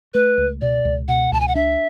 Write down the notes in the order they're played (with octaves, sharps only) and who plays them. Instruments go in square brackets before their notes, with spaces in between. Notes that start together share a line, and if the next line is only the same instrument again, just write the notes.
[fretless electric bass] A3 [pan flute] B4
[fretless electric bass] C#2
[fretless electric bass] B2 [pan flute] D5
[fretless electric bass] C#2
[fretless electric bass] B2 [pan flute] F#5
[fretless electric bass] C#2 [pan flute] A5
[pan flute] G#5
F#5
[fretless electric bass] D4 [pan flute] E5